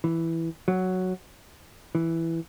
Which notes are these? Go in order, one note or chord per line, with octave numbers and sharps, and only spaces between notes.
E3
F#3
E3